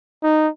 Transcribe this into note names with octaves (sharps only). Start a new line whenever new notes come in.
D#4